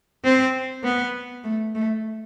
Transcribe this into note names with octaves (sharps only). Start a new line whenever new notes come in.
C4
B3
A3
A3